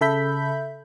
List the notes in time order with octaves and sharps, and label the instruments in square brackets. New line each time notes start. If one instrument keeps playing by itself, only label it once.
[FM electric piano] C#3 A4 E5 B5 G6 B6